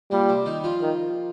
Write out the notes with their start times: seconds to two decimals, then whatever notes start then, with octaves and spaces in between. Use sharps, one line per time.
0.11 A#2 G3 A#3
0.29 C3 C4
0.46 D#3 D#4
0.64 F3 F4
0.81 D#3